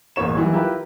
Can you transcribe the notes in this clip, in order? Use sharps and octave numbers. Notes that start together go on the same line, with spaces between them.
A1 E2 A#3 C#5 E7
D#3 E3 F#3 G3
E4 F4 G4 A#4 B4